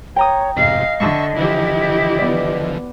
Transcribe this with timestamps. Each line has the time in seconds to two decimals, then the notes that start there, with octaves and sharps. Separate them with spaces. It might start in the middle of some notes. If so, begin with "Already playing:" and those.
0.16 C#5 G5 A#5 D#6
0.57 F2 G#2 C3 D#5 F5
1.00 D3 E5 C#6
1.37 D3 E3 F3 E4 G4
2.19 B3 D5